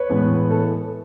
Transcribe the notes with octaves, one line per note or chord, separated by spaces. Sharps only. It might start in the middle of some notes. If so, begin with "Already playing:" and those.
Already playing: B4 C#5
A2 E3 G#3 B3
A4